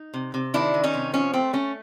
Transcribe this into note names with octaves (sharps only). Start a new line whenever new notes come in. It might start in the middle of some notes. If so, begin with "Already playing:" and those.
Already playing: D#4
C3
C3
D#3 D4 E4
D#3
C#4 D#4
C3
F3 C#4
A3 C4
A3 C#4